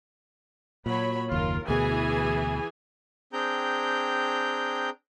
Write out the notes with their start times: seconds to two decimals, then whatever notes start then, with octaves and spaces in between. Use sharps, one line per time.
0.86 A#2 F#3 C#5 B5
1.32 F#1 D#2 F4 A#4
1.68 D2 B2 E3 G#4 G#5
3.33 C4 D4 G#4 G5 A#5 G6